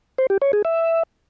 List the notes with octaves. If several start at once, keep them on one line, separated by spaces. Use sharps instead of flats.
C5
G4
C#5
G#4
E5